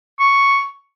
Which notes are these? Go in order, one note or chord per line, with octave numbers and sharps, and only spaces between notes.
C#6